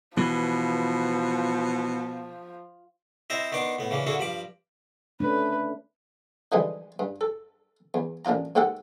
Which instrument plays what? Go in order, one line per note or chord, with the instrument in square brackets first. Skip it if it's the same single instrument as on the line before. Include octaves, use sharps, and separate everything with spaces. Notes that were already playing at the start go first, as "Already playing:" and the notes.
[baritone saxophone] B2 [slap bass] E3 [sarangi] F3
[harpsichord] C4 E4 C5 D#5 E5 A#5
D#3 B3 D4 D#4 C6 D6
A2 B3
C#3 E3 A#3 D4
D3 A#3 D4 E4 F#4 G#4
G2 F3 B5 D6
[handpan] A3 C#4 D4 [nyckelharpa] B4
[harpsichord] D3 E3 F3 G3 G#3 D#4
G2
A4
E2
A1 A#3 D4 F4 A#5
G#2 A#3 G4 A4 F#5